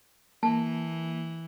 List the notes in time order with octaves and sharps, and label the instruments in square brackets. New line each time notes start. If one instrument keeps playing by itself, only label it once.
[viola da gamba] E3 [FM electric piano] A#3 [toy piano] A5